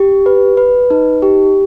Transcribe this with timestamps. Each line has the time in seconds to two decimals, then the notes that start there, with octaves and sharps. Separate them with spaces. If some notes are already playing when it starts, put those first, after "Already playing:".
Already playing: G4
0.26 B4
0.57 B4
0.90 D#4
1.22 G4